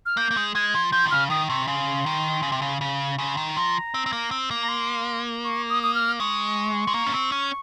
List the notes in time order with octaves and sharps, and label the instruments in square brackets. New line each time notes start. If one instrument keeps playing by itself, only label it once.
[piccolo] F6
[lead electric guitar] A#3 [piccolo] G6
[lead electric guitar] A#3
G#3
[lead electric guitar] G#3 [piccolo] G#6
[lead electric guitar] F3
[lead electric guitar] F3 [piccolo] G6
[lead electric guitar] D#3
[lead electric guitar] C#3 [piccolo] F6
[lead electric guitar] D#3 [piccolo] D#6
[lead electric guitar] C3 [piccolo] C#6
[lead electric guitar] C#3 [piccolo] C6
[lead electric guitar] D#3
C#3
C3
C#3
C#3
[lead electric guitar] C#3 [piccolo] C6
[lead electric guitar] D#3
[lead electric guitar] F3 [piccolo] A#5
[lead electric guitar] C4
C4
A#3
C4
A#3
[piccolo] A#5
C6
C#6
D#6
D#6
F6
[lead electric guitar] G#3 [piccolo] C#6
[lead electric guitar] G#3
A#3
C#4
C4
C#4